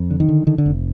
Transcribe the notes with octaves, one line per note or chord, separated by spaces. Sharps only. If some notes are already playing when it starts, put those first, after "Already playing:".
Already playing: F2
D3
D#3
D3
D3 D#3
D3
F1